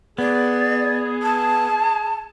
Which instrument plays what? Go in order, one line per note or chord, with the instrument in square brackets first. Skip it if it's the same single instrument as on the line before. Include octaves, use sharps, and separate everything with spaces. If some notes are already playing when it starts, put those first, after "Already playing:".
[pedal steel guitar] B3 [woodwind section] G#4 [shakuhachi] D5
[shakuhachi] A5